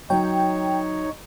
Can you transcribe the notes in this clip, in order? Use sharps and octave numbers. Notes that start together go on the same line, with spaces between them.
F#3 D#4 C#5 G5